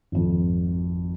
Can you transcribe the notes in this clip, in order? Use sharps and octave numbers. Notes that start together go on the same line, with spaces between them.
G#1 F2